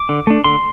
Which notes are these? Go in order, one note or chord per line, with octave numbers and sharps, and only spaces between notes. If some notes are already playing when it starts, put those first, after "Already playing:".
Already playing: D6
D3
A3 D4
D3 C6